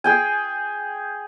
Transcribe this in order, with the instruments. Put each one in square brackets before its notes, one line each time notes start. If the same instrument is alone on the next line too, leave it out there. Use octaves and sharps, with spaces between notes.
[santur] G#4 G5 G#5